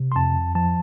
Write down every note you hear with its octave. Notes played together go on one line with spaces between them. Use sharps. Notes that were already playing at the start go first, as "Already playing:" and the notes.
Already playing: C3
C6
F2 A5
F3 A5